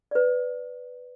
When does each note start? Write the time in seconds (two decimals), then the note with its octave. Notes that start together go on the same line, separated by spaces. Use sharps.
0.11 B4 D5